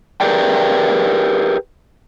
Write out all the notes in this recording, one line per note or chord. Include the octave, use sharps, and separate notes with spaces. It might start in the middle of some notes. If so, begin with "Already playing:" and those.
G4 G#4 A#4 B4 D5 G5